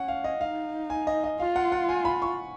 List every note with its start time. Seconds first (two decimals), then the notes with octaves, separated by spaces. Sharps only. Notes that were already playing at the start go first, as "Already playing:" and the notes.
Already playing: C#4 F#5
0.08 F5
0.24 D#5
0.41 D#4 F5
0.90 G#5
1.07 D#5
1.24 D#5
1.40 F4 F5
1.56 F#5
1.72 F#5
1.89 G#5
2.05 B5
2.22 C#6